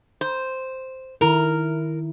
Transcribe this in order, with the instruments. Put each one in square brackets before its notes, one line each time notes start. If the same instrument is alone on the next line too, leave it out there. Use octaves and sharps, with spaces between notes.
[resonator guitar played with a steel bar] C5
[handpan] D#3 E4 [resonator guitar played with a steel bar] A#4